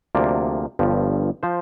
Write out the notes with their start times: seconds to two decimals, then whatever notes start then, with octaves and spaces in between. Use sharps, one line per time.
0.15 D2 C3 F3 A#3 D5
0.79 G1 G2 F3
1.43 F3 C5